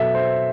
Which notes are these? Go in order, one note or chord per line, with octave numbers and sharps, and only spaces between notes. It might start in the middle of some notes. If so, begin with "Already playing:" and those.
Already playing: B2 F#3 A4 E5
C5